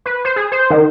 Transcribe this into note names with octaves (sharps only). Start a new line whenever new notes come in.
B4
C5
G#4
C5
D#3